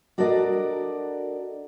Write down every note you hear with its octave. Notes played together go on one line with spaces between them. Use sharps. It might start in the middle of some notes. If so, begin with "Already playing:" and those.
D4 F#4 A4 A#4 D5 D#5